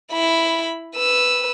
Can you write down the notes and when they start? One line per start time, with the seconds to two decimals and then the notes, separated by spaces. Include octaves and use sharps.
0.12 E4 B5
0.95 B4 E6